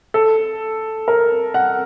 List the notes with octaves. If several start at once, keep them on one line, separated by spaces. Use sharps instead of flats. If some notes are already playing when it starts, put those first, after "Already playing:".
A4
A#4
F#5